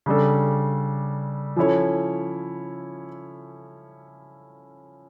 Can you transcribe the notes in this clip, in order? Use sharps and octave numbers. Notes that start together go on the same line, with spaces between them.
C#3 G3 D4 A4
F3 C#4 E4 A4 C#5